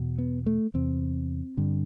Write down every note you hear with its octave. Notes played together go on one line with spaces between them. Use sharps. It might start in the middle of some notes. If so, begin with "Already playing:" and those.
Already playing: E2 B2
B3
A3
E2 C3 C4
G2 D3